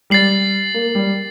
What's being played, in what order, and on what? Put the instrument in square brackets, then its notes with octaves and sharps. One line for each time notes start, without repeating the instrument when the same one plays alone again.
[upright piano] G3 [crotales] A6 C7 F#7
[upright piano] A#3
G3